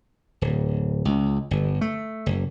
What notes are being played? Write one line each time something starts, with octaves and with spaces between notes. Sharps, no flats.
D1
C#2
G1
A3
F#1